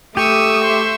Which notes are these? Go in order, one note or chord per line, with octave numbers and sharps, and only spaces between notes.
A3 G4 C#6 D#6 E6
C5 E5